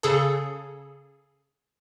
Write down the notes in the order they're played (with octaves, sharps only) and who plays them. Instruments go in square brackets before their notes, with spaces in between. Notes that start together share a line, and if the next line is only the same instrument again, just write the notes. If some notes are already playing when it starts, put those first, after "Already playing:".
[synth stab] C#3 G#4 A4